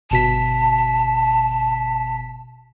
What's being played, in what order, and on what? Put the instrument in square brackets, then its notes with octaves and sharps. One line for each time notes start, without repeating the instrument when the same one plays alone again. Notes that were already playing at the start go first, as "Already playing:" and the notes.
[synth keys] G1 B2 B6 [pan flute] A5